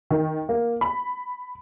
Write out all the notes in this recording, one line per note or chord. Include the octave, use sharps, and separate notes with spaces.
D#3
A#3
B5